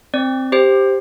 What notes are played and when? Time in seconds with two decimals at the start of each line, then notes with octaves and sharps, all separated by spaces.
0.14 C4 D5
0.52 G4 C5